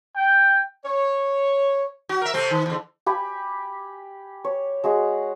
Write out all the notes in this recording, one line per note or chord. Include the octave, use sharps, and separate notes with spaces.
G5
C#5
F#4
A#4 E5
C3 A3 C4
D#3
E2 D3
G4 G#5 B5
C#5
G#3 F#4 G#4